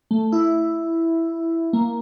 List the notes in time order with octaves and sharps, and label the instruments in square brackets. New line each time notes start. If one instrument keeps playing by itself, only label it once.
[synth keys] A3
E4
A#3